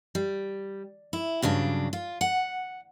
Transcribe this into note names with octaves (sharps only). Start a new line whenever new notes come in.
G3
E4
G2 C#3 F#3 D4
F4
F#5